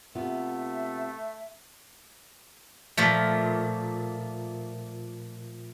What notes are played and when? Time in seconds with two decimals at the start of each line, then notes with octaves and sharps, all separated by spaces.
0.15 C3 A3 B3 F4 E5
2.97 A#2 F3 A3